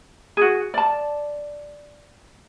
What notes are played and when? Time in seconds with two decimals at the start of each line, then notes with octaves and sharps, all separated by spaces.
0.37 F#4 G#4
0.74 D5 A5